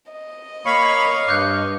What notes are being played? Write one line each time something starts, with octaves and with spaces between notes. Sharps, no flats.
D#5
A#3 C#5 F5 B5 C#6 C#7
G2 D6 F#6 G6